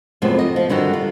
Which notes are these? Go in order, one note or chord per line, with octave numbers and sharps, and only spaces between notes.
F#2 A2 C3 F3 G#3 B3
F2 D#5
F3
G2 D3 D#3 F#4
F4